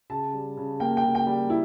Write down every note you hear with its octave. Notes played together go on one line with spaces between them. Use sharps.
C#3 A5
G3
C#3
A#3 G5
G5
C#3
G5
G3
E4